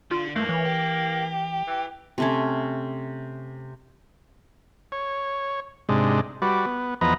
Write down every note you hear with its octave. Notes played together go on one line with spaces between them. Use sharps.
D3 F4
G2 E3 A3 A#3
E3 C#5
G4
E3
C3 A3 C#4
C#5
G#2 C3 G#3 D4
G3 F#4 B4 D5
B3
E2 F3 B3 B4 D#5 A#5